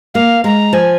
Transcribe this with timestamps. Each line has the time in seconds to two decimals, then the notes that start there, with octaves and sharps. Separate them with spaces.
0.14 A#3 F5
0.44 G#3 A#5
0.73 F3 G#5